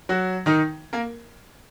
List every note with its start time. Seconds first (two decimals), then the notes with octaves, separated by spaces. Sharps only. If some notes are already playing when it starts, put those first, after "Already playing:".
0.09 F#3 F#4
0.46 D#3 D#4
0.93 A#3 A#4